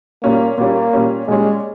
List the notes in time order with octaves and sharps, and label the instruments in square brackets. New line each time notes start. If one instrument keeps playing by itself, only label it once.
[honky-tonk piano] A#2 G3 C#4 [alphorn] A#3
[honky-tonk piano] A#2 G3 C#4 [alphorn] A#3
[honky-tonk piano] A#2 G3 C#4
[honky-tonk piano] A#2 G3 C#4 [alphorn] G#3